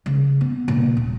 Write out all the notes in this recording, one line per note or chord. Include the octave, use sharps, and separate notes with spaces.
C#3 C#4
B3
A#2 C#3
D#1